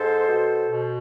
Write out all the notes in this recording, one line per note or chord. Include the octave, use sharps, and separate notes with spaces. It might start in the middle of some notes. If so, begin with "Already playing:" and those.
Already playing: G#2 A4 C5
B2
B2